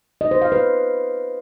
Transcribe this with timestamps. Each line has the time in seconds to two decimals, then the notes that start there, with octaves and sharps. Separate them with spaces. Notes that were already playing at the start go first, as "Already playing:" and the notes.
0.21 D#5
0.31 C5
0.42 F5
0.52 B4